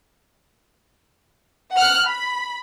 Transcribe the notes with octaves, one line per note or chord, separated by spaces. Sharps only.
F#5 F6 F#6
B5